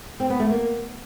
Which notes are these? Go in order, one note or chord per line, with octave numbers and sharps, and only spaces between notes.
C4
B3
A3
A#3